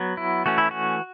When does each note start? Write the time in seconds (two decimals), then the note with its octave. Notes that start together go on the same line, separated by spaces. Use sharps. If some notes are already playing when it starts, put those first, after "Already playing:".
Already playing: F#3 B3
0.17 E4
0.46 E3 A3 C#4 F#4
0.58 E4
0.71 F#4